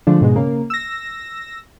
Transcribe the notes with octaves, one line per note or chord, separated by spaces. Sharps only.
D3 F3 G#3 A3 D4
G#2 B2 G#3
C#3 A#3
E6 A#6